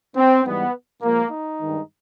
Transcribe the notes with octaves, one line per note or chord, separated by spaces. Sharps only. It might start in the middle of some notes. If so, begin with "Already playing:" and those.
C4
G#2 E3 G3 B3
A#2 F3 G#3 A#3
D#4
G2 D#3 G#3